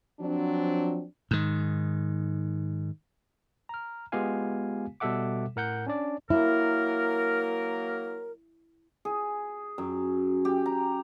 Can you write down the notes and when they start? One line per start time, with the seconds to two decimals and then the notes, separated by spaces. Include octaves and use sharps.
0.20 F3 F#3 C4 D4
1.31 G#2 D#3
3.69 A#5 F6
4.12 G#3 B3 F4 G4 F5 G#5
5.00 B2 G3 A4 E5 F#5 D6
5.56 A2 A#4 F#5 G6
5.86 C#4 D4 D5
6.30 F#3 A#3 E4 A#4
9.05 G#4
9.78 F#2
10.45 G4
10.66 A#5